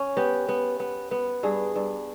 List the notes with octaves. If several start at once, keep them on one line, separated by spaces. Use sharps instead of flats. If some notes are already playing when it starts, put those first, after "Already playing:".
Already playing: C#4
B3 G4
B3
B3
B3
G2 G#4
G2